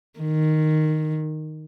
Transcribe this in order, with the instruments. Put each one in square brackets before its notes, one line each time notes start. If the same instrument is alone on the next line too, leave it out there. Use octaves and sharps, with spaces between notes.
[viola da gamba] D#3